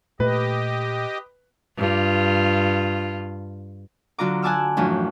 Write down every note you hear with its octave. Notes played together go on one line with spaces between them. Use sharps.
A#2 A3 G4 B4 D#5
G2 F4
D3 F#3 F4 A#5 D6
F#5 G#5 A5 D6 E6 F6
F#2 A2 E3 F3 D4